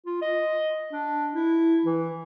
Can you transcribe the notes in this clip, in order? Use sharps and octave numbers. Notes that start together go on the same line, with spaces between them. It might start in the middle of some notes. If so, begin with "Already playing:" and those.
F4
D#5
D4
E4
E3